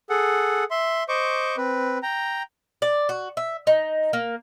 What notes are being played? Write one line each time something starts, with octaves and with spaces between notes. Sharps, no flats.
G#4 A4 F#5
E5 C6
C5 D#5 C#6 D6
C4 B4
G5 A#5
D5
F#4
E5
D#4
A#3